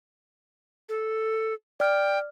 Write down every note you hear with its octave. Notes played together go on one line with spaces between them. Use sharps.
A4
D5 G5 F6